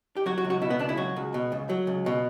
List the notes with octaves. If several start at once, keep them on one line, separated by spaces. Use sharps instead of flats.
G4
F#3 F#4
F#4
C#2
F#4
B2 E4
B3
C#2 D4
E4
F#3 F#4
C#2
B2
C#2
F#3
C#2
B2